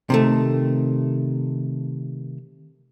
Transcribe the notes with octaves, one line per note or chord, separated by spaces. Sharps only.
C3 D#3 A3